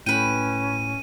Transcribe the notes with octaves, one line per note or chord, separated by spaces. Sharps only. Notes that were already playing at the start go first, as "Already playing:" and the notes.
A2 C#4 B4 G5 D#7